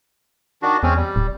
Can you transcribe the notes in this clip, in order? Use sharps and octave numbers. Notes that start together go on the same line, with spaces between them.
D#3 D4 F#4
E2 G#3 C4 C#4
G3
D1